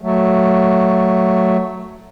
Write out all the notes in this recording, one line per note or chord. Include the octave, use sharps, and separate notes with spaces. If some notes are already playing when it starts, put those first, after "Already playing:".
F#3 A3